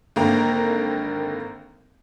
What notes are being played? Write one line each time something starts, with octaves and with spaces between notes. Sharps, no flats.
G#1 D3 A#3 A#4 G5 A#5